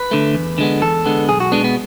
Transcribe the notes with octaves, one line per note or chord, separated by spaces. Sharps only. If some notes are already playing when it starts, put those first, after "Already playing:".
Already playing: B4
D3 A3
E2
D3 G#3 B3
E2 A4
D3 G#3 B3
B1 G#4
F#4
B2 G#3 B3 D4
B3